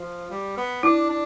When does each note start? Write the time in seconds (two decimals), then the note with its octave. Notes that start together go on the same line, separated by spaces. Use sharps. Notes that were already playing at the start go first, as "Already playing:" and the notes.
Already playing: F3
0.31 G3
0.57 B3
0.83 D4 E4
1.10 D4